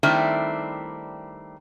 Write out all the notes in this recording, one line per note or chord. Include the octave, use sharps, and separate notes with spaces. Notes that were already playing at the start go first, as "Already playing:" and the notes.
D#3 G3 A3 C4 D4 E4